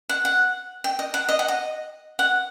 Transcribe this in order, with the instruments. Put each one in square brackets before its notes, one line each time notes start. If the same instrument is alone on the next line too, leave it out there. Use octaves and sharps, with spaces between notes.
[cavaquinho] F#5
F#5
G5
D#5
F#5
D#5
F#5
D#5
F#5